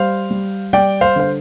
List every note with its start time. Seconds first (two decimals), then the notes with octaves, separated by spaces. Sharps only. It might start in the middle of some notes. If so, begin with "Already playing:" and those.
Already playing: G3 C5 F5
0.31 G3
0.73 G3 D5 G5
1.01 C5 F5
1.16 D3 C5